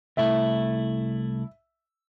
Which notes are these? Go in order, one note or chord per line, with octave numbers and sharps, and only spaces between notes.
C2 A3 E4 E5